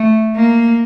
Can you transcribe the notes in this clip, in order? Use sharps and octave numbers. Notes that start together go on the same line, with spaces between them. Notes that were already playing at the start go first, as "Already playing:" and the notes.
Already playing: A3
A#3